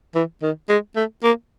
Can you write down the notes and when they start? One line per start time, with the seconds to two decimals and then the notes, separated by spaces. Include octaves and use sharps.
0.15 E3
0.42 D#3
0.69 G#3
0.96 A3
1.23 A#3